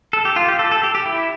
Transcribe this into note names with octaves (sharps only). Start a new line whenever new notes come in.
A4
G4
F4
G4
A4
A4
G4
G4
E4